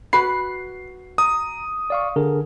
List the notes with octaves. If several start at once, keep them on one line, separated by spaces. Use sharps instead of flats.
F#4 B4 B5 C7
A#5 D#6
D5 F5 C#6
D3 G#4 A#4